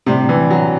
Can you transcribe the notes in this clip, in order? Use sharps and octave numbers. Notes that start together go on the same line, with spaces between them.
A2 C3 G3 D4
E3
F#3